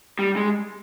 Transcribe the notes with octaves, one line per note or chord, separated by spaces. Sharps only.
G3
G#3